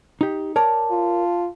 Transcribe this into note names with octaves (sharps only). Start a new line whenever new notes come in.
D#4 G4
A#4 C#5 D5 A5
F4